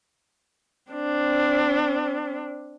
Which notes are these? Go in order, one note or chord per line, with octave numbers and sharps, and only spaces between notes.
C4 D4